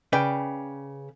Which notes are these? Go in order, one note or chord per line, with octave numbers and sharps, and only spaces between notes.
C#3 B4 D5 G5